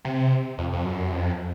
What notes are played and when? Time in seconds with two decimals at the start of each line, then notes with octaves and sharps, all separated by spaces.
0.05 C3
0.58 F2
0.73 F2
0.84 F#2
1.12 F2